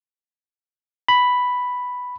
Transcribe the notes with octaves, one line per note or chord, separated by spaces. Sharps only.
B5